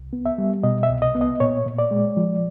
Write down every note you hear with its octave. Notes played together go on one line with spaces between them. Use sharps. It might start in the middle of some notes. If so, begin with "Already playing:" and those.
Already playing: C2
B3
E5
G3
B2 D#5
E5
C2
D#5
B3
D#5
A#2 C#5
A#2
D5
G#3
F3